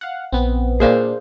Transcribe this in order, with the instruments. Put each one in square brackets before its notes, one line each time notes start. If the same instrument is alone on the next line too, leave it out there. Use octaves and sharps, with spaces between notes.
[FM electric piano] F5 F#5
[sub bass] A#1 [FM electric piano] B3 C4
[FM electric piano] A#2 A#3 D4 [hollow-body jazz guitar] G#4 C5 F5